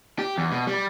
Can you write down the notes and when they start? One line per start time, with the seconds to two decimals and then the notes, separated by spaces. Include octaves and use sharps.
0.19 G4
0.38 E2
0.51 B2
0.67 G3